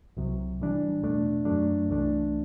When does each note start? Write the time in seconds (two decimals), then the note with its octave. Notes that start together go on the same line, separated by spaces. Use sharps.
0.17 C2 C3 F#3
0.59 A2 E3 G3 D4
1.03 E2 B2 A3 D4
1.45 F#2 F#3 A3 D4
1.88 C2 C3 E3 A3 D4